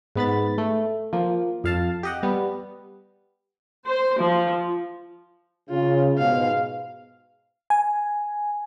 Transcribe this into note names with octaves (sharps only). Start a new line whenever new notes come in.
G#2 B3 B5 A6
A3
F3 A#3
F2 F5 A5
G4 D#5 F#5
G3 B3
C5
F3
C#3 F4
G#2 B2 F5
G#5